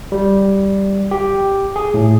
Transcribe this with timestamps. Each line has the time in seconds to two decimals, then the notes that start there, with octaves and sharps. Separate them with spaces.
0.12 G3
1.11 G4
1.76 G#4
1.94 A2